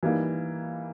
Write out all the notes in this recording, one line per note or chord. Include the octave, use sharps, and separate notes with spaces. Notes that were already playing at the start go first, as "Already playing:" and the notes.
E3 G3 A#3 D#4